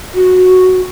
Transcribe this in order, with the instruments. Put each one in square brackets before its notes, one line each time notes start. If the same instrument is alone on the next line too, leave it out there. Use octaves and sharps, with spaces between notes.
[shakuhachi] F#4